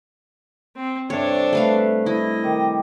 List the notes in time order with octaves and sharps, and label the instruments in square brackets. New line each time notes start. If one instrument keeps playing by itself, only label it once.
[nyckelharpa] C4
[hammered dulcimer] G2 C3 [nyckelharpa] D4 A4 [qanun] C#5
[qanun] A3 B4 F5
[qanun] E4 [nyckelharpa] D#5
[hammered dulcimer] D#3 G4